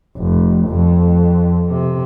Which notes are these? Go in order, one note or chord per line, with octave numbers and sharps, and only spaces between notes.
F1
F2
C3